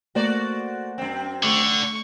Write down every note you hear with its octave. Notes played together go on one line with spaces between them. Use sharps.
A3 A#3 F#4 C5 D5
F#2 C4
D3 A3 C#6